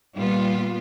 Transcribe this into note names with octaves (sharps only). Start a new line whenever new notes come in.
A#2 G3 B3 F4